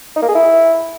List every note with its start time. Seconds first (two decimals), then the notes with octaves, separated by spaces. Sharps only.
0.16 D#4
0.22 A#3
0.29 G#4
0.35 E4